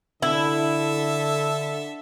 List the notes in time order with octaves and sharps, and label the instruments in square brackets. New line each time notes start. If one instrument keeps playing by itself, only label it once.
[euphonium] D3 [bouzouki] E4 [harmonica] A4 E5